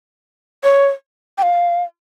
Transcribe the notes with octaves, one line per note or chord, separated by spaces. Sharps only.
C#5
G5
F5